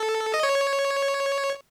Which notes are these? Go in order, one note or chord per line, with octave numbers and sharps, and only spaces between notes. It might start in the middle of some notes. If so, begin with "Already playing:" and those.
Already playing: A4
D#5
C#5